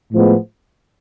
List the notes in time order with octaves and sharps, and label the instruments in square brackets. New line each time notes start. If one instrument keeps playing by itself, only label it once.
[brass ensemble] A2 F3 G#3 B3